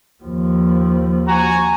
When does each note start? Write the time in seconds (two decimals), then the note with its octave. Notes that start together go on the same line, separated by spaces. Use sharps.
0.24 D#2 F3
1.28 F#4 G#5 A#5